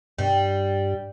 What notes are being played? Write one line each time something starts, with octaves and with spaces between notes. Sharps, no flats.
G2 G3